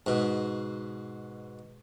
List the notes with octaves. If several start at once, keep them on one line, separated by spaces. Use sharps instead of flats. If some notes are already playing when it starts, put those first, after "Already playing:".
G#2 B2